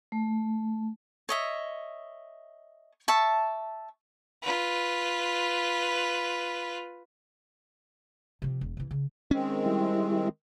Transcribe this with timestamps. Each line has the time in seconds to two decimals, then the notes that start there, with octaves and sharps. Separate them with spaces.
0.12 A3
1.29 C#5 D#5 E5
3.08 E5 A5 C#6
4.42 F4 B4
8.42 C3 F3
8.61 E1
8.77 C3 E3
8.91 C#3
9.31 D#3 G#3 C4 C#4
9.66 G3 E4